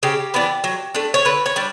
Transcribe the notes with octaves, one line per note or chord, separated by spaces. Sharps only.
C#3 G4
E3 B3 D4
F#3
A3 D4
C#5
D3 B4
C#5
G3 D4